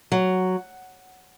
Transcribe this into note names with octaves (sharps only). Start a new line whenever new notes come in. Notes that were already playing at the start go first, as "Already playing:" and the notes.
F#3